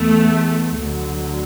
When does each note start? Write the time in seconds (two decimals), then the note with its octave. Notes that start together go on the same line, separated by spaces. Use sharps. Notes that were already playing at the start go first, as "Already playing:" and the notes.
Already playing: E2 E3 A3 B3
0.76 D2 D3 F#3